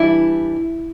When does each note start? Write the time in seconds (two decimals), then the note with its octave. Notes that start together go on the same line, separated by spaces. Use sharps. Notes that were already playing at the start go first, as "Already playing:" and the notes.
Already playing: E3 G3 D4 E4